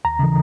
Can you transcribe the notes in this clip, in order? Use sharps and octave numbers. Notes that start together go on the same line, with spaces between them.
D#2 A#5
C#3 E3